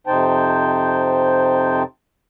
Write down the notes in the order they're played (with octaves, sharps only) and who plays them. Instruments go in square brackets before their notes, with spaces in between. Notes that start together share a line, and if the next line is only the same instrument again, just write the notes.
[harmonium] F2 C3 D#4 C5 G5 A5